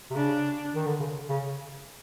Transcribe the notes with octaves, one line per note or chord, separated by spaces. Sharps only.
C3
C#3 D4
D#3
D3
C#3
C#3